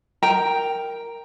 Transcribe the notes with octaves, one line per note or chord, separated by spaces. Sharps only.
A#4 G5 A#5